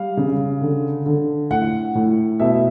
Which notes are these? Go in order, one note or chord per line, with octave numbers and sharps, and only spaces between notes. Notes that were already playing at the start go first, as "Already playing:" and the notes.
Already playing: G3 F5
C#3
D3
D3
A2 F#5
A2
B2 E5